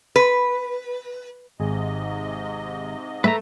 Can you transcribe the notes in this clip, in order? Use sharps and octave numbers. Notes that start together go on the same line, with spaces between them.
B4
G#1 G#2 C3 G#4 D#5
A3 B4 E5 A#5